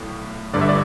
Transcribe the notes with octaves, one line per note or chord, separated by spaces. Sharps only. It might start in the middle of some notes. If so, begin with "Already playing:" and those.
Already playing: B1 A2
G1 G2 D3 D5
E5
D5